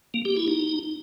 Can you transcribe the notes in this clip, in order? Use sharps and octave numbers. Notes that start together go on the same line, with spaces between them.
A#3
G4
E4
D#4